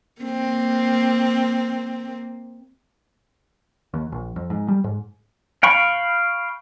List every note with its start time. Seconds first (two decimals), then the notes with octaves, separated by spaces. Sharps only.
0.22 A#3 C4
3.94 D#2
4.12 A#1
4.36 F2
4.50 G#2
4.68 G3
4.84 G#2
5.63 F5 G5 B5 C#6